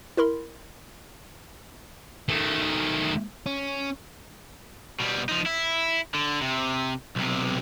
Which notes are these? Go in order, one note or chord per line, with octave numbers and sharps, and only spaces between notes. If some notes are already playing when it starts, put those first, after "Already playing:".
E4 A#4 B5 C6
D#3 A3
C#4
B2 G3
F3 D#4
E4
D3
C3
B1 C3